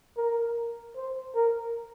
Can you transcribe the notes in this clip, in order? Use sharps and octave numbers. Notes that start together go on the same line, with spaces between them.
A#4
C5
A#4